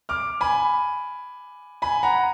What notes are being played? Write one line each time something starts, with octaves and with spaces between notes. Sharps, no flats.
D6 F6
G#5 B5
G#5 B5
F#5 A#5